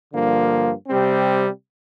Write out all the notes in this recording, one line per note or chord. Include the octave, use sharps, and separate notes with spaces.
G2 D3 F3 A#3
C3 G3 C4